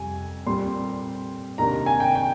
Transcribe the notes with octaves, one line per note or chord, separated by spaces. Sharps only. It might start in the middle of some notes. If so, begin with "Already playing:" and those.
Already playing: F2 C3 G3 G#5
A#2 G3 C4 C6
C3 D#3 A#3 D4 A#5
G#5
G5
G5